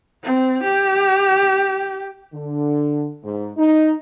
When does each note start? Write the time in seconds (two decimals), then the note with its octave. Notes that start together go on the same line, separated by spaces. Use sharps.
0.23 C4
0.63 G4
2.33 D3
3.24 G#2
3.57 D#4